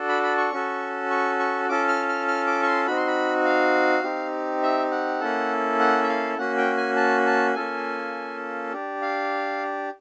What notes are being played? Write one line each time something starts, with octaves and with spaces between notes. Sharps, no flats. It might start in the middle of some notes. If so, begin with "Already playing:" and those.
Already playing: D4 F#4 A4
B5
B5
C#6
C#4 F#4 A4
C#6
C#6
C#4 F4 A4 D6
F6
F6
F6
D6
C#6
C6
C4 D#4 F#4 B5
C6
B5
F5
C4 D#4 G4
E5
F#5
A#3 C#4 E4 A4
F#5
E5
F5
A#3 C#4 F#4 F#5
G5
G#5
A5
A5
A#3 C#4 F4 A4 G#5
D4 G4
F5